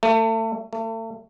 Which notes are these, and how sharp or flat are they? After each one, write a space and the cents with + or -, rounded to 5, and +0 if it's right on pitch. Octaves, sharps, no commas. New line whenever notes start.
A3 +30
A3 +35